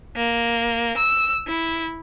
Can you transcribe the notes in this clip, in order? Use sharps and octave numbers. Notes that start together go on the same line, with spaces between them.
A#3
E6
E4